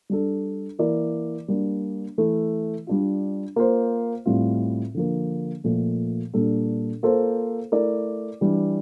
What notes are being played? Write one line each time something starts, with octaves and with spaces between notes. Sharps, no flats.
G3 D4 A4
E3 A#3 E4 A#4 D5
G3 A#3 D4
E3 A3 E4
G3 D4 F4
A#3 F4 C5
A2 G3 C4 F4
D3 F3 A#3
A#2 F3 A3
A#2 G3 D4 A4
A#3 F4 A4 C5
A3 E4 A#4 D5
E3 G3 D4